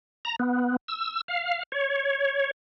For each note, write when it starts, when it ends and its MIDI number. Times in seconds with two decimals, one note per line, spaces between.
0.25 0.36 82
0.39 0.76 59
0.88 1.21 88
1.28 1.63 77
1.72 2.51 73